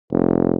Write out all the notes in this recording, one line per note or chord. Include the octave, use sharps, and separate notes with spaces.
F1